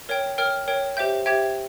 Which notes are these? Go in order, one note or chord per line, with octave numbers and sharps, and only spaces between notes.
A#4 C#5 G5
A#4 C#5 G5 F6
A#4 C#5 G5
G4 C5 E5 G5 G6
G4 C5 E5 G5 G#6